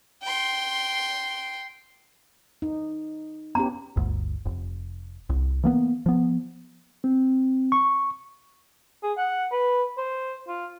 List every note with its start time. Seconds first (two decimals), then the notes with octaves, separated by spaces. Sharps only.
0.23 G5 C6
2.62 D#4
3.55 B3 C#4 G4 A#5
3.96 G1 D2
4.45 F1
5.29 C2
5.64 E3 A#3 B3
6.06 F3 B3
7.04 C4
7.72 C#6
9.03 G#4
9.18 F#5
9.52 B4
9.98 C5
10.48 F4